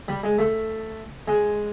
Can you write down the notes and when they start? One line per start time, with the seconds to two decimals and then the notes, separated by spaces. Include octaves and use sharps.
0.08 G3
0.24 G#3
0.39 A3
1.28 G#3